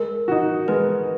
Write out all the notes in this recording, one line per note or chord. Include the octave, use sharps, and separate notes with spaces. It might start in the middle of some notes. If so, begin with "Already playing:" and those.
Already playing: G#3 A#4
D#4 F#4
G#3 B4